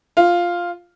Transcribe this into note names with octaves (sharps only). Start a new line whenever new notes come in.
F4